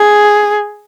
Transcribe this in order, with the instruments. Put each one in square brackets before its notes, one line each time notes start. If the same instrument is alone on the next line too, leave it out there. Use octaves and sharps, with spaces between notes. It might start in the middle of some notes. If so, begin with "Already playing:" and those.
Already playing: [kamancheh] G#4